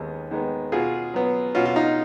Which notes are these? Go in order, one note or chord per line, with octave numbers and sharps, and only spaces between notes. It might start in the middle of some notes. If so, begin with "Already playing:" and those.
Already playing: D#2 D#3 G#3 B3
D#3 G#3 B3
B2 F4 G#4
F#3 B3
B2 C#4 F4
F4
D#4